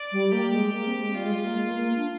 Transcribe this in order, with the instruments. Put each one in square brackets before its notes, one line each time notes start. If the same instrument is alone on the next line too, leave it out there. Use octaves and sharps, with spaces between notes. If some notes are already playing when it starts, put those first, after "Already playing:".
Already playing: [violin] D5
[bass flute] G3
[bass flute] A#3 [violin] G4
[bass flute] G#3
A#3
C4
G#3
[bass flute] G3 [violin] F4
[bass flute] G#3
G#3
A#3
G#3
A#3
A#3
D4